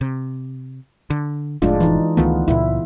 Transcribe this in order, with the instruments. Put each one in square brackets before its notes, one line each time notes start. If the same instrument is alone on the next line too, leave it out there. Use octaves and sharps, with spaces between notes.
[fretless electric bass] C3
D3
[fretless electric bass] F1 F2 A2 [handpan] G#3 D4 F4
[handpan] E3 D#4
[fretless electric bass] C#2 D#3 A3 [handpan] B3 F4
[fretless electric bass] C#2 A#2 [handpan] E4